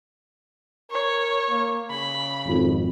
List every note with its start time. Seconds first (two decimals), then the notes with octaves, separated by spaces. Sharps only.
0.91 A#4 C#5
1.50 A#3
1.91 C#3 B5
2.46 G#1 F2